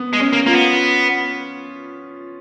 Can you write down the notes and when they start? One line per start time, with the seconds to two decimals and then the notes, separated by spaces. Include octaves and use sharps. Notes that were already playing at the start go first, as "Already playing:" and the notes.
Already playing: B3
0.13 G#3
0.20 C#4
0.33 A#3
0.46 A#3 F4
0.53 B3